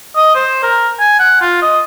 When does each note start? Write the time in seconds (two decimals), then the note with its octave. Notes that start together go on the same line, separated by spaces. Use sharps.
0.16 D#5
0.35 C5
0.63 A#4
1.00 G#5
1.19 F#5
1.41 F4
1.62 D#5